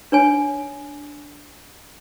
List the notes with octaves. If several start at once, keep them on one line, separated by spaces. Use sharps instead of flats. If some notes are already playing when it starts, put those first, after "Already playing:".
D4 C#5 G#5